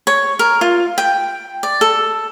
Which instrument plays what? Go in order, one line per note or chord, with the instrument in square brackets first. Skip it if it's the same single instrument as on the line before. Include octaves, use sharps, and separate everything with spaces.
[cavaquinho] C#5
A#4
F4
G5
D5
A4